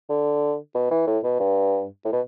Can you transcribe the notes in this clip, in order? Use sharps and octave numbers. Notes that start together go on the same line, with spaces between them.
D3
B2
E3
A2
B2
G2
A2
B2